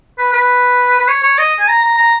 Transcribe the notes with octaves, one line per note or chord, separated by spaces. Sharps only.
B4
B4
B4
C#5
C#5
D#5
G#5
A#5
A#5
A#5